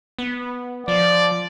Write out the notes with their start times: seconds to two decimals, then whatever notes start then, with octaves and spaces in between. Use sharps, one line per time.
0.19 B3
0.88 F3 D5